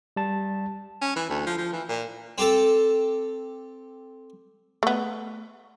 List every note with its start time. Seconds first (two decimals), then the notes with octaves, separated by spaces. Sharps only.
0.16 G3 A5
1.02 C#4
1.16 E3
1.30 D2
1.46 F3
1.58 F3
1.73 E3
1.89 A#2
2.38 C4 G4 A4
4.83 A3 B3